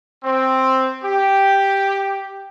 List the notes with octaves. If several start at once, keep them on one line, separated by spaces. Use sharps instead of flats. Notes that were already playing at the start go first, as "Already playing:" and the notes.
C4
G4